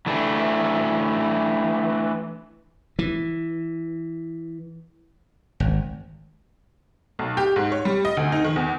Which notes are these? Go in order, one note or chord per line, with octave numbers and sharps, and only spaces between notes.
E3 A3 D4
E3
G#1
B1
G4
G#2
C#5
G3
D#5
D2
D#4
D#3
E2